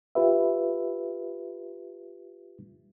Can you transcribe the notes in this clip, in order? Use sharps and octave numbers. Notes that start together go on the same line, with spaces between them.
F4 G4 B4 E5